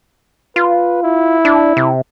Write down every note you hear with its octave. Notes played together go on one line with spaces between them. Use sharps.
F4 B4
E4
D4
C3